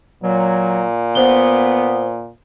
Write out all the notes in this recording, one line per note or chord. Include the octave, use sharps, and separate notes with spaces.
A#2 F#3
B3 C5 G7